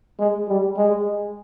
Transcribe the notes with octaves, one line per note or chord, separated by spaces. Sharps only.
G#3
G3
G#3